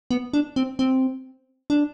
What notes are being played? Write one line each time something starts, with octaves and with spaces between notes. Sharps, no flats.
B3
D4
C4
C4
D4